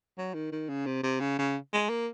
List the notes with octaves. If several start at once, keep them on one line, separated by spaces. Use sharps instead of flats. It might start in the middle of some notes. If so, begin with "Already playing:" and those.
F#3
D#3
D#3
C#3
C3
C3
C#3
C#3
G#3
A#3